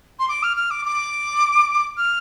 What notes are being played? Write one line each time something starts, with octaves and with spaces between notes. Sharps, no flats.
C6
D6
F6
F6
D6
D6
F6